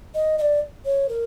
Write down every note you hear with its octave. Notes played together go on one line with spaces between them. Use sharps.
D#5
D#5
D5
C#5
A#4